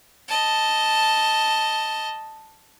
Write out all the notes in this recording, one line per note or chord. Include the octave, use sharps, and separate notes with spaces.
D#5 A5